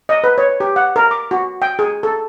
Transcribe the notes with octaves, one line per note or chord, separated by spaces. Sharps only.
D#5
B4
C#5
G4
F#5
A#4
D6
F#4
G5
G#4
A4